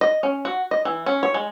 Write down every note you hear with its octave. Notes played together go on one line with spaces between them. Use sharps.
D#5
C#4
F#4
D#5
E3
C#4
C#5
G#3